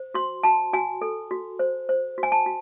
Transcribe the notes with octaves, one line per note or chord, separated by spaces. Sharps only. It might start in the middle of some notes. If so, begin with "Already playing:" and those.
Already playing: C5
F#4 C6
F#4 A5
F#4 G#5
A4
F#4
C5
C5
F#4
G#5
A5
F#4